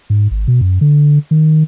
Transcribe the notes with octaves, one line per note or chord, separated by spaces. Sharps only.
G#2
G#1
B2
F#2
D3
D#3